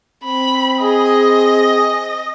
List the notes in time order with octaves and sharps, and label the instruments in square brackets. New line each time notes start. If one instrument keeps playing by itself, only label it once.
[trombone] C4 [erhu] B5
[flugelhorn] G#4 [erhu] D#5